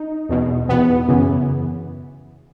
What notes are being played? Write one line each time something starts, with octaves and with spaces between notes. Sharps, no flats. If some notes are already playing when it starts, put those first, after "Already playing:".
Already playing: D#4
E2 B2
E2 B2 B3
F#2 C#3 E3